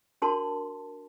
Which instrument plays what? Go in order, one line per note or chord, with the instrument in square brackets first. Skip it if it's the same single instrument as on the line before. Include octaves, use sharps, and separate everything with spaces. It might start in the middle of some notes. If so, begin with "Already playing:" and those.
[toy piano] D4 F#4 A#4 A5 C6